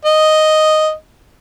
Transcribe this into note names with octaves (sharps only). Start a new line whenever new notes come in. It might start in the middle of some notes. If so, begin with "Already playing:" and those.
D#5